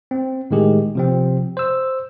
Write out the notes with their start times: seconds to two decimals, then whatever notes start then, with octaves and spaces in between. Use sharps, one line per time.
0.11 C4
0.51 A2 D#3 G#3 G4 G#4
0.95 C3 F3 C4
1.57 C5 E6